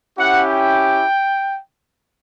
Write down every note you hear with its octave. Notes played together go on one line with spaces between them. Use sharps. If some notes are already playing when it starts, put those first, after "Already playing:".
C#4 E4 G4 F#5
G5